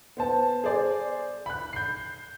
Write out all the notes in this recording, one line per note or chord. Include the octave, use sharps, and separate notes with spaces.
B3 C5 A5
G#4 C5 D5
B5 F#6
G6 C7